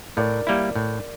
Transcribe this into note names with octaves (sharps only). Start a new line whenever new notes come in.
A2 A#4 D5
G3 A#3 E4
A2